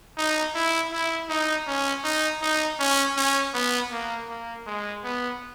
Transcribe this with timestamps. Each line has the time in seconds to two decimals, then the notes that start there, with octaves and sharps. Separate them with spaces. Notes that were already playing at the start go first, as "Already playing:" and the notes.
0.17 D#4
0.55 E4
0.92 E4
1.29 D#4
1.67 C#4
2.04 D#4
2.42 D#4
2.79 C#4
3.17 C#4
3.54 B3
3.92 A#3
4.28 A#3
4.66 G#3
5.04 B3